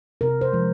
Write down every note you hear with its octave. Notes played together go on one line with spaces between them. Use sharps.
C3 A#4
C5
F3 G#3